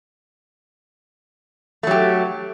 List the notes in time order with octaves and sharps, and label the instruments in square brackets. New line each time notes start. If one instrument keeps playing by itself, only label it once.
[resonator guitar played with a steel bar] A3
F#3
G4